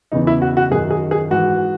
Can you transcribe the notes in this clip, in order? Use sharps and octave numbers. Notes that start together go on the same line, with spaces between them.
E2 C#3 E3 D#4
E4
F#4
F#4
F#2 D#3 G#4
G#4
G#4
G#2 E3 F#4